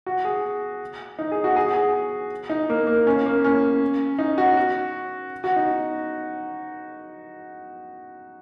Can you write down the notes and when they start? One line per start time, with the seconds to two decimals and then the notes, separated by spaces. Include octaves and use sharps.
0.06 F#4
0.25 G#4
1.19 D#4
1.32 G#4
1.44 F#4
1.56 G#4
1.65 F#4
1.74 G#4
2.50 D#4
2.69 A#3
2.87 A#3
3.07 C#4
3.26 A#3
3.44 C#4
4.19 D#4
4.38 F#4
4.57 F#4
5.44 F#4
5.56 D#4